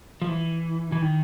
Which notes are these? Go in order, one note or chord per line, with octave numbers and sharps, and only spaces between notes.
F3
E3
E3
D#3